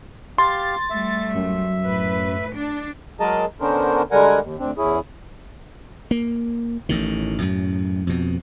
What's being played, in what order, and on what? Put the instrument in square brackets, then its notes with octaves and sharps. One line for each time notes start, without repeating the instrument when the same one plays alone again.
[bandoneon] G4 F5 [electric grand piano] C6 [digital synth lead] A6
[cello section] G3 A3 [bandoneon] E5
[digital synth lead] F#2
[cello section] A2 B4
D4
[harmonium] F#3 G#3 G#4 A#4 D#5 A5
D3 B3 C#4 D4 A#4 C5
D3 G3 G#3 A#4 F#5 G#5
D#2
D2 C4 D4
E2 C#4 E4 G#4
[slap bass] A#3
A1 A2 D#3
F#2 A2
F2 B2